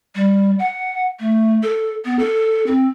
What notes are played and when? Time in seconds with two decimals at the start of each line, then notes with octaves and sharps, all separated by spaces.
0.15 G3
0.59 F#5
1.20 A3
1.63 A4
2.05 B3
2.19 A4
2.67 C4